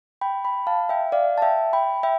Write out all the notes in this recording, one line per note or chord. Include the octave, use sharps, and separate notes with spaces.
G5 B5
G5 B5
F5 A5
E5 G5
D5 F5
A5
E5 G5
G5 B5
E5 G5